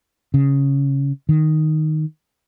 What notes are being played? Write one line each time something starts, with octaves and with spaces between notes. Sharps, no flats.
C#3
D#3